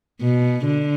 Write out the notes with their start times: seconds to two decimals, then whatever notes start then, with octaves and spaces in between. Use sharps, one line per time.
0.21 B2
0.66 D3